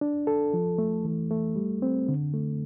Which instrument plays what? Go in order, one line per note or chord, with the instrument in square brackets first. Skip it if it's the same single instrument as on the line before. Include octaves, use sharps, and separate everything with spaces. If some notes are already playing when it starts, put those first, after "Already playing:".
[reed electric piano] D4
A4
F3
A3
E3
A3
G3
C4
D3
A3